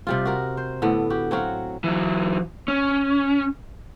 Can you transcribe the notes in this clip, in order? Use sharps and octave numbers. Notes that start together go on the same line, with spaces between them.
C3 G3 F4
F#4 A#4
C5
A2 D3 B3
F#4 G4
F#3 C4 F#4 F5
E3 F#3
C#4